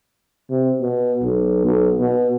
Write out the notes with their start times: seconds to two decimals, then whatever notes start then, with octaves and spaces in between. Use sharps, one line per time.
0.50 C3
0.81 B2
1.22 B1
1.65 B1
2.00 B2